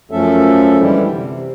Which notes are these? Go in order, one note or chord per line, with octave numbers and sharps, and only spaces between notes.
F#2 F3 A3 C#4 A4 E5
D3 E3 G3 G#3 E4 G4
C3